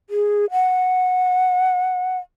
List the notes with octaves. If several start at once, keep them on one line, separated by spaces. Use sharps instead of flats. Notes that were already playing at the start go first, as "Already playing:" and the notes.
G#4
F#5